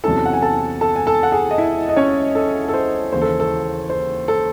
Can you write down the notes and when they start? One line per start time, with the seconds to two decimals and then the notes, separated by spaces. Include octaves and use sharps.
0.04 E2 C3 F#3 C#4 E4 A4 A5
0.26 F#5
0.33 G#5
0.42 A4 A5
0.81 A4 A5
0.96 G#5
1.07 A4 A5
1.23 F#5
1.32 G#4 G#5
1.51 D#5
1.58 E4 E5
1.89 D#5
1.97 C#4 C#5
2.35 A4
2.69 A4
2.74 C5
3.12 D#2 C#3 E3 C5
3.22 A4
3.40 A4
3.90 C5
4.28 A4